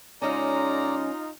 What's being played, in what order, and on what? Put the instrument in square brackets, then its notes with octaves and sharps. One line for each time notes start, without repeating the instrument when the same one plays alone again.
[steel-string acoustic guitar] C#3 G#3 C#4 [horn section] D#4 F4 [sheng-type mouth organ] D5 A#5